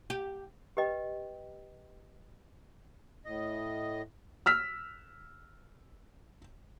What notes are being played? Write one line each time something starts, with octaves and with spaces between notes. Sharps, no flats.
G4
G4 B4 D#5 G5
A2 D#5
E6 F6 B6